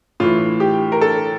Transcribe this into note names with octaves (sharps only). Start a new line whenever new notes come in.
A2 E3 F4
G4
A#4
A4